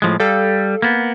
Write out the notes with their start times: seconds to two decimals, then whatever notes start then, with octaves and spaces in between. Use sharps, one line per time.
0.02 A2 F3 G#3
0.20 G3 A4 F5
0.82 A#3 B3